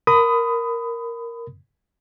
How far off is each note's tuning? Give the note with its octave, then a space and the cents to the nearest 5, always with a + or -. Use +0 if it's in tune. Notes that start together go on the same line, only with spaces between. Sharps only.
A#4 +0 B5 +25 D#6 +0